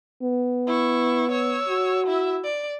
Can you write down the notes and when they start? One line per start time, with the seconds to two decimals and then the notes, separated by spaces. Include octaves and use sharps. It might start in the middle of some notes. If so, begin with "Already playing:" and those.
0.23 B3
0.67 E4 C#6
1.31 C#5 E6
1.69 F#4
2.07 E4 E5
2.44 D5